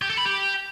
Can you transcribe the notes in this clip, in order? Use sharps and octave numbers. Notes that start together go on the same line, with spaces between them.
G4
A4
B5
G4